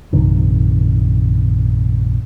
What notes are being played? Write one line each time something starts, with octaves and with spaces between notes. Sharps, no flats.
A#1 F#2 C3 D#3